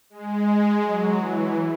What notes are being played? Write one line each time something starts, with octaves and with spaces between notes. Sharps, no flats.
G#3
F#3
E3